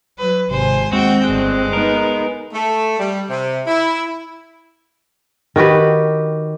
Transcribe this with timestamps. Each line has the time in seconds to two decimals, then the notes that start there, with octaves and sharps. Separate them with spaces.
0.19 F#3 B4
0.51 G#1 C3 C5 G#5
0.92 D#2 G#3 C4 F#4 G5
1.24 G1 G2 G#3 F#6
1.73 B3 D#4 A#4
2.53 A3
2.99 G3
3.30 C3
3.67 E4
5.56 D#3 F#4 G4 B4